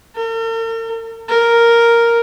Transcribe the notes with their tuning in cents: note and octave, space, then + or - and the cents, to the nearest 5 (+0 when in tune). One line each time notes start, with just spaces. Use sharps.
A#4 -45
A#4 +0